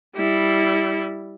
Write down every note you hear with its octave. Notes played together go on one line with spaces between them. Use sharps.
G3 E4